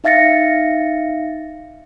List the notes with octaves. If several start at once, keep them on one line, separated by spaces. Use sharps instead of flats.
D#4 E5 F5 A6 A#6 C#7